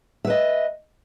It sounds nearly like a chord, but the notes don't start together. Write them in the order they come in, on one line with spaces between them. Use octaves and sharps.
E5 B4 D#5